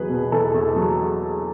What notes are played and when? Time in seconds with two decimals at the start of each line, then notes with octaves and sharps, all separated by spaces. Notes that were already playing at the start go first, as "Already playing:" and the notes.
Already playing: E2 F#3 G#4 B4
0.09 B2
0.32 E2 A4
0.54 E2
0.76 F#3